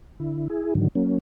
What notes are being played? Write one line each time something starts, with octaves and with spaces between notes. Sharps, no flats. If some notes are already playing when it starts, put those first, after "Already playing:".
D3 E4
E4 G#4
G#2 D3 D#3 F#3
F#3 A#3 C#4